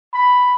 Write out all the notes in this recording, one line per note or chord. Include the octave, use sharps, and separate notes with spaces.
B5